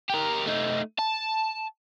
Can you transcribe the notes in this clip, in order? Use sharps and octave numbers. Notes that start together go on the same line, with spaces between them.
G4 A#4
A3 D#4
A5